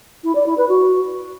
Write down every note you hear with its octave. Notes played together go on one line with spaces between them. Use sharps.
E4
D5
E4
B4
F#4